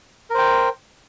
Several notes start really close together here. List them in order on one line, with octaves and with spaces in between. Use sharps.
A#4 C5 G5